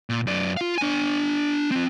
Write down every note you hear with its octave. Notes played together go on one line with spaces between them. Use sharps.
A#2
F#2 D5
F4 F5
D4 G#5
C4 F4